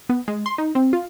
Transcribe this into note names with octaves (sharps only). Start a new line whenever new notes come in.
B3
G#3
C6
D#4
C4
F4